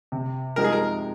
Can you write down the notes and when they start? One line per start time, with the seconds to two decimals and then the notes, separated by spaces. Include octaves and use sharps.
0.12 C3
0.56 F3 G#3 D#4 G4 A#4
0.64 G#4
0.73 A#4